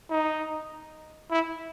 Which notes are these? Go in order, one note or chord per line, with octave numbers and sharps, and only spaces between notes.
D#4
E4